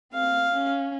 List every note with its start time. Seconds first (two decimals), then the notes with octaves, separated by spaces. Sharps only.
0.13 C4 F5
0.53 C#4